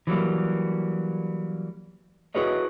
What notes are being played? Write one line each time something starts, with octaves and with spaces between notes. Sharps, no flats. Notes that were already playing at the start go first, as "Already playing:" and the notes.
E3 F#3 G3 A#3
E4 F#4 G#4 B4 C#5 D#5